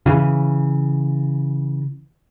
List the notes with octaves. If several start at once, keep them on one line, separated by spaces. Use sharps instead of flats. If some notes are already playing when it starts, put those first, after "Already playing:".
C#3 E3